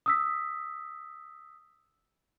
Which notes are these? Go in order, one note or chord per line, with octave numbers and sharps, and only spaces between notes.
D#6 E6 B6